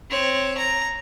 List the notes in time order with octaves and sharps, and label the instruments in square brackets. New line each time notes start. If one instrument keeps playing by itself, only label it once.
[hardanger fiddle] C4 C#5
A#5